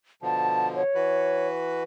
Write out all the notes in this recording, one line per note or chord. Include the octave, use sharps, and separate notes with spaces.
B2 D3 F3 A5
C#5
E3 F#4 B4